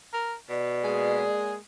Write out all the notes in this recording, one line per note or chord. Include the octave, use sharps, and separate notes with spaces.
A#4
B2 D5
G#3 A#3 G#4